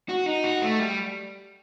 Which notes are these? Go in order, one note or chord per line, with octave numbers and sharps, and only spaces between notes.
F#4
D#4
F#4
A3
G3